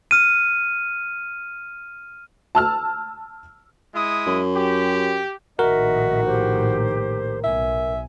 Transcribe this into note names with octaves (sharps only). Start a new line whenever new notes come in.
F6 D#7
A5 E6 F6
G#3 E4 D#6
F#2
G4
A#1 A2 D#3 F#4 A#4 D#5 E5
G4 C5
B1 E5 G#5